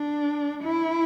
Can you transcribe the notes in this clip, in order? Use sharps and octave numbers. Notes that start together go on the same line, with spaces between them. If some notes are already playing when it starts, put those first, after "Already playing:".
Already playing: D4
E4